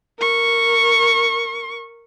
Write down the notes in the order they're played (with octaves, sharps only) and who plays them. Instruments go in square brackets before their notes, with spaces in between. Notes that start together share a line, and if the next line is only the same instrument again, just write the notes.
[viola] A#4 C#6